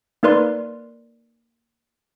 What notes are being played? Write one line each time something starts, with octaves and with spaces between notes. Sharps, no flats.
A#3 D#4 A#4 B4 D5 C6